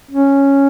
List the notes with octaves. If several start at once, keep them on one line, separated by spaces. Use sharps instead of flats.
C#4